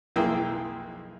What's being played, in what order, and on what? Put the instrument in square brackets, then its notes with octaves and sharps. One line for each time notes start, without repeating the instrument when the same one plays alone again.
[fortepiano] B1 F2 A#3 E4 G#4 G5